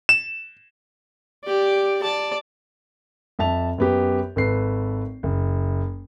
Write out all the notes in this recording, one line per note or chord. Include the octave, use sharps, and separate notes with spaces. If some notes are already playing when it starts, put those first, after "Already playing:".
E7
G4 D5
D5 A5
F2 E5 A5 F7
F#2 B3 G4
G#1 A4 B4 C7
F#1